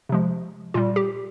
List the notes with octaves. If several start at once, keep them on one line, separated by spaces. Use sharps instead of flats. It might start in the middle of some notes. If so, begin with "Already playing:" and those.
C3 F3 G#3
A#2 G3 F4
G4